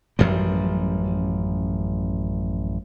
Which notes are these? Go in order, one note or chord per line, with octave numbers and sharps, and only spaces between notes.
A1 F#2 F3 G3